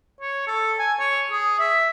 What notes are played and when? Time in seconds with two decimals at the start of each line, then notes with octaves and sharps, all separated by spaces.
0.21 C#5
0.47 A4
0.79 G#5
1.00 C#5
1.32 G#4
1.60 E5